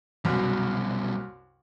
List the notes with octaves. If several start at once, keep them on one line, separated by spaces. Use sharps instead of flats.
C2 F#2 B2 G3